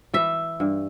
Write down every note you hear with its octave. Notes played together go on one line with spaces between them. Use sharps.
E3 E5
G2